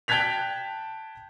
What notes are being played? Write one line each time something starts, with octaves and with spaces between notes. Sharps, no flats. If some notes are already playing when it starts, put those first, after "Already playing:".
G5 A5 F#6 G#6 B6 F7